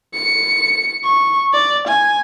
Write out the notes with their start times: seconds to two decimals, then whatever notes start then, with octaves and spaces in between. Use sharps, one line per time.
0.14 C#7
1.04 C#6
1.53 D5
1.88 G#5